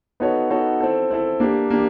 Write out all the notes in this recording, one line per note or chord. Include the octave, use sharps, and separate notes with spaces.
B3 D#4 F#4 A4 C#5
B3 D#4 F#4 A4 C#5
C4 E4 A4
C4 E4 A4
A#3 D4 G4
A#3 D4 G4